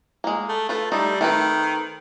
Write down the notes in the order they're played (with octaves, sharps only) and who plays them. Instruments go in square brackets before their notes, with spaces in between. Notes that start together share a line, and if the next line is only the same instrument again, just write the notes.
[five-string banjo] G#3 A#3
[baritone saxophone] A3
[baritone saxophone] A3 [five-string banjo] F4 B4
[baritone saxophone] G3 [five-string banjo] A3 D#4 A4
[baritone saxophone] D#3 [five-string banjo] A3 C4 B4